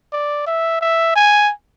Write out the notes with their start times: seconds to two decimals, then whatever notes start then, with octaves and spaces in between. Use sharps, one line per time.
0.13 D5
0.46 E5
0.81 E5
1.15 G#5